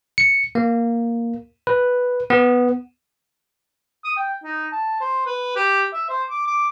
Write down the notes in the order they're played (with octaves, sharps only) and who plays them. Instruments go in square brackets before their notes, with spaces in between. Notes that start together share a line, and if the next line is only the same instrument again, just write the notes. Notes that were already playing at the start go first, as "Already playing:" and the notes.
[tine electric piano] C#7
A#3
B4
B3
[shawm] D#6
G5
D#4
A5
C5
B4
G4
E5
C5
D6
D6